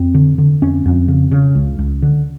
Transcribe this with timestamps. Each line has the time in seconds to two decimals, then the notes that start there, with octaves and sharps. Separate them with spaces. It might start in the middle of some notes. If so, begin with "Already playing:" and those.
Already playing: F2 C4
0.14 D3
0.38 D3
0.62 F2 C#4
0.86 F2
1.08 C#3
1.31 C#3
1.55 C#2
1.79 C#2
2.02 D3